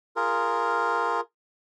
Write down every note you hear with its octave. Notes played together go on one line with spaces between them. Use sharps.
F4 G#4 A#4